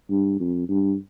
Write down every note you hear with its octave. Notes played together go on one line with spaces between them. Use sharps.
G2
F2
G2